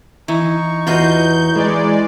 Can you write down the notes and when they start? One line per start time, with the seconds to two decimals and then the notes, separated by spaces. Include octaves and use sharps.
0.28 E3 D#4 C#6
0.87 E2 E3 F4 F#4 D#5 G6
1.55 E3 G#3 D5